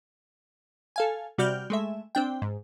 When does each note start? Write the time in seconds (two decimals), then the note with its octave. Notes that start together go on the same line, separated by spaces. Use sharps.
0.96 A4 F5 G#5
1.38 C3 G3 F#4 D5 F6 G6
1.70 G#3 A3 E5
2.15 C4 D4 G5
2.42 G#2